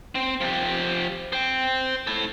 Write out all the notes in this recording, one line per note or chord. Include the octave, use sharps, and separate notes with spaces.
C4
F3 G4
C5 G5
E4 A4